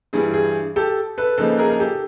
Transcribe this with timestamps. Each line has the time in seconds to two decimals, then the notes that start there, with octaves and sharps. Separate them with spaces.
0.13 G2 E3 G3 G#4
0.34 G#4
0.76 G4 A4
1.18 A4 B4
1.37 C#3 F3 A#3 D#4 A4 B4
1.58 G#4 A#4
1.70 A#4
1.80 G4 A4